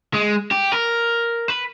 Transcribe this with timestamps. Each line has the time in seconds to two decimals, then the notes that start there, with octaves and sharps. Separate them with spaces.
0.14 G#3
0.51 G4
0.72 A#4
1.48 B4